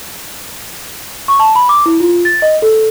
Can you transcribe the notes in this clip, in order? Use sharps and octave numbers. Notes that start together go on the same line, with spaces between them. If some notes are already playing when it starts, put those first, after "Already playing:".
C#6
A5
B5
D6
E4
F4
A6
D#5
A4